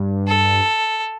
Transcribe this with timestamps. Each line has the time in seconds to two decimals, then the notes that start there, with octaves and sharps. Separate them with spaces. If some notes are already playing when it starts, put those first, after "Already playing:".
Already playing: G2
0.28 A4